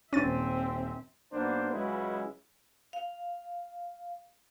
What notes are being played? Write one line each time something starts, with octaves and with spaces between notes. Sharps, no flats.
D#1 C4 C#4 E5 A6 D#7
B1 A#3 B3 D4 C5
C#2 C#3 F#3 G#3 E4 B4
F5